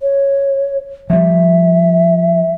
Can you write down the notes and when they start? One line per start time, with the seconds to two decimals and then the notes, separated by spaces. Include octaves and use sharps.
0.01 C#5
1.10 F3 G3 E5